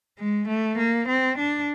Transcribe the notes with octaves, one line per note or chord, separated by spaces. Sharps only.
G#3
A3
A#3
C4
D4